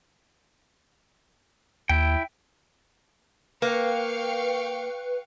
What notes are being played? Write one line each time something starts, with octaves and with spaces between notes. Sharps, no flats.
D#2 E4 G5
A#3 B4 F5 G5 C#6